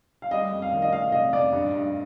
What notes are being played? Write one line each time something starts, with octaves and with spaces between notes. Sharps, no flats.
F5
G3 D#5
F2
F5
D#3
D#5
D#3 F5
C3 D#5
F2 D5
G2
G2